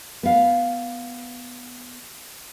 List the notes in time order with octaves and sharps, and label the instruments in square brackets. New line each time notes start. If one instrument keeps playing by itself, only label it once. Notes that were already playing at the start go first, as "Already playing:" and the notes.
[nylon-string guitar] B3 F5